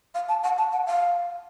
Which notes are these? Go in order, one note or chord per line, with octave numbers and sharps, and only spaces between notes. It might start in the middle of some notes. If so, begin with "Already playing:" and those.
F5
A5
F#5
A5
F#5
F5